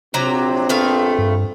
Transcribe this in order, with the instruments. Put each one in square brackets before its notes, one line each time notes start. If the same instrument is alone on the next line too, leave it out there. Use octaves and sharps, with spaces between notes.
[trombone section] A#1 C4 [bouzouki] C3 F#3 A#5
[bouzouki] A3 B3 F5
[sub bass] G2